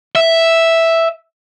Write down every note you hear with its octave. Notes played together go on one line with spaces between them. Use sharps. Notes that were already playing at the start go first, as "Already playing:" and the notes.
E5